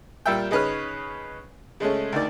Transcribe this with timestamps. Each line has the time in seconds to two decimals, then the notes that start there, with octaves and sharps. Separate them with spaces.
0.26 A#2 G3 E5 G5
0.51 C#3 D#4 B4 C#5 F6
1.80 C#3 G#3 A3 C#4
2.13 D2 D#3 D5